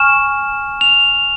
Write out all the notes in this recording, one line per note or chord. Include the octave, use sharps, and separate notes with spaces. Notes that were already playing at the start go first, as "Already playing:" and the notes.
Already playing: G#5 C#6 F6 E7
F7